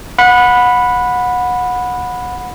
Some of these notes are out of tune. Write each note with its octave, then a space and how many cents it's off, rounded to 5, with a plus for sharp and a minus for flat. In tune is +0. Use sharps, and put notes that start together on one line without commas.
F#5 -25 B5 +0